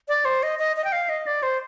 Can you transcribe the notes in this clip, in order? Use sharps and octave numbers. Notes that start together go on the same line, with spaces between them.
D5
C5
D#5
D#5
D#5
G5
F5
D#5
D5
C5